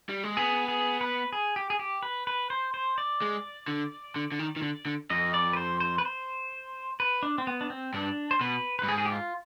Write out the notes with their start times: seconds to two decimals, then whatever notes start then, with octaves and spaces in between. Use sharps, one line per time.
0.09 G3
0.24 G#3
0.37 B3 G#4
0.68 G#4
1.01 B4
1.33 G#4
1.56 G4
1.70 G#4
1.79 G4
2.03 B4
2.27 B4
2.50 C5
2.74 C5
2.98 D5
3.22 G#3
3.68 D3
4.16 D3
4.32 D3
4.39 D#3
4.56 D#3
4.62 D3
4.86 D3
5.10 F2 D#5
5.34 D5
5.53 B4
5.57 C5
5.80 C5
5.98 B4
6.05 C5
7.00 B4
7.23 D4
7.38 C4
7.47 B3
7.61 D4
7.70 C4
7.94 G2 D4
8.31 C5
8.41 B2 B4
8.79 G2 B4
8.88 G#2 G#4
8.98 G#4
9.05 G4
9.12 F4